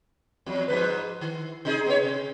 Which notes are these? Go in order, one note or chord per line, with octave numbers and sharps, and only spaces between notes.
E2 F#3
G#2 F3 B4
D#3
C3 D#4 G#4
B3 C#5
C3